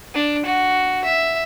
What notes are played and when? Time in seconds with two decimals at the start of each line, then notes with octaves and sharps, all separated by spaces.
0.14 D4
0.46 F#4
1.04 E5